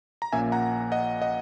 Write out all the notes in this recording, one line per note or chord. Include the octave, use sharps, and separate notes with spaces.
A#5
A#1 A#2 A#3 C#4 E5 G#5
F#5 A#5
D#5 F#5
D#5 F#5